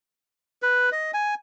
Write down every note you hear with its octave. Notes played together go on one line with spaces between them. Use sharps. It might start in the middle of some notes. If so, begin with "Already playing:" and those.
B4
D#5
G#5